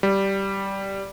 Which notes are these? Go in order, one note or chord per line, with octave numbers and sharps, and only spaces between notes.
G3